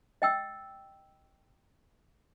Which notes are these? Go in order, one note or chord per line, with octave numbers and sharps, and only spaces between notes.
D#5 G5 E6